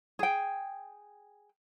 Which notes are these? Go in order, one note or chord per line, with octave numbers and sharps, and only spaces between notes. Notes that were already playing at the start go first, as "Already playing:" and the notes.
G#4 G5